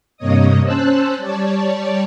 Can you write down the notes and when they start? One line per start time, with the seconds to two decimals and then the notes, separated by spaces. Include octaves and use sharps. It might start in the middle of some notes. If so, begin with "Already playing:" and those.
0.17 G2 C3 A#3 C#5 D#5 D#6
0.64 C#4 C5 A5 E6 F#6
1.18 G3 C#5 D5 A5